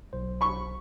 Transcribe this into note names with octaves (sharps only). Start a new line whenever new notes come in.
B1 C5
B5 C#6